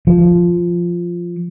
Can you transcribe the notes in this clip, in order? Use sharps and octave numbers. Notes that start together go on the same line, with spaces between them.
F3